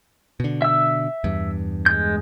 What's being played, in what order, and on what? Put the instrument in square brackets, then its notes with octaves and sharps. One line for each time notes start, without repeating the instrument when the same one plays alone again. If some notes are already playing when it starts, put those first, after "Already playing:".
[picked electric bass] B2 D3
[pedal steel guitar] E5 E6
[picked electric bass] E2 G2
[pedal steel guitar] G#3 G6